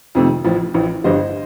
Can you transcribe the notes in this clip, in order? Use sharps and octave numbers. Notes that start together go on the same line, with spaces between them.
F2 C3 D#3 A3
A1 A2 F3
A1 A2 F3
G1 G2 D3 G3 C5 D#5